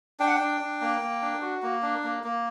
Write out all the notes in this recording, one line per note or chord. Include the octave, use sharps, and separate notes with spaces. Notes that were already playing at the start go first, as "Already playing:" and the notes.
D4 G5
F#5
G5
D4
D4
A#3
A#3
D4
F#4
A#3
D4
A#3
A#3